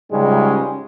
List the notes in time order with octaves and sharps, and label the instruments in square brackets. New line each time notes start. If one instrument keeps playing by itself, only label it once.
[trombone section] C#2 G#2 C#3 G3 G#3 C#4